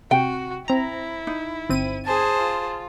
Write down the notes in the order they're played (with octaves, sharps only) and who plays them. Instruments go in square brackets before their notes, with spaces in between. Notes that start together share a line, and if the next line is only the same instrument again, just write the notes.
[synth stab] C3 [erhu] F#4 [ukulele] G5
[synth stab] C4 A#5 [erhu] E4
[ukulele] D#4
[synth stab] G1 C4 D#7
[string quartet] G#4 C5 A5 [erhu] G#5
[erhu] F4